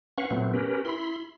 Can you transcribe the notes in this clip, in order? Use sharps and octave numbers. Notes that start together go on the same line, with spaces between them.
C#4 B4 F5 F#5 C#6
A#2 F#3 A3 B3 C4
C#4 G4 A#4 B4
E4 B5 C6